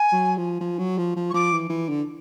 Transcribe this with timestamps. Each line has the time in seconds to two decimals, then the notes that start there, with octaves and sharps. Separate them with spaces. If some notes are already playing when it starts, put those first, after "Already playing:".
Already playing: G#5
0.12 F#3
0.37 F3
0.60 F3
0.79 F#3
0.98 F3
1.16 F3
1.30 C#6
1.34 F3 D6
1.52 E3
1.69 E3
1.89 D3